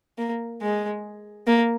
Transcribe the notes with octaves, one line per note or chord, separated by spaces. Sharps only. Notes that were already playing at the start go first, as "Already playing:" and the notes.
A#3
G#3
A#3